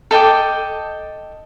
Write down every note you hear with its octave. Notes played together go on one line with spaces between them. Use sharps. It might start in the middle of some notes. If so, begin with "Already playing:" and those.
A4 D#5 G5 D6